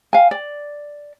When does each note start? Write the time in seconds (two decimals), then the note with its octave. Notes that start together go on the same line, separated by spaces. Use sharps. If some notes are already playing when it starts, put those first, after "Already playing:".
0.13 F5 G#5
0.31 D5